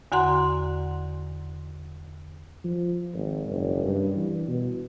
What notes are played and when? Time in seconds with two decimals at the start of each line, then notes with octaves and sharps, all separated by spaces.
0.12 E2 D3 F#4 F#5 A#5 C6
2.64 F3
3.14 G#1
3.49 F#1
3.84 G2
4.16 E3
4.48 B2